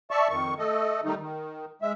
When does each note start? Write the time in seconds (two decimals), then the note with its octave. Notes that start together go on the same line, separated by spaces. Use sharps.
0.11 D5 E5 A5 C#6
0.30 F2 D#3 C#6
0.58 A3 A4 D#5
1.05 D#3 G3 A3 D#4
1.20 D#3
1.82 G#3 E5